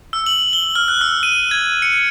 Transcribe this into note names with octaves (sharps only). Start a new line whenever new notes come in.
E6
F#7
G7
F6
F#6
E6
D#7
G#6
C#7